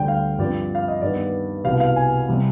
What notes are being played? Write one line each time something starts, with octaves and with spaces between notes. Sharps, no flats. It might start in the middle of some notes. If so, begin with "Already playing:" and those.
Already playing: D2 D3 G3 G5
F5
G2 F3 C4 D5
F5
D#5
G2 D#3 B3 D5
C2 B2 B3 F5
F5
G#5
C3 G3